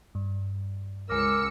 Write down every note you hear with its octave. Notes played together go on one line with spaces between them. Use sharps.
G2
C#2 G#3 A#4 D6 E6 C#7